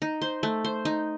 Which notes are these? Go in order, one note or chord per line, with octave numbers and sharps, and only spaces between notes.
D#4
C5
A3
C5
D#4